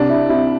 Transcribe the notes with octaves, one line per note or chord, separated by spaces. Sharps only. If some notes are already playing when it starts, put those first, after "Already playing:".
Already playing: C2 D4
E4
C3 E4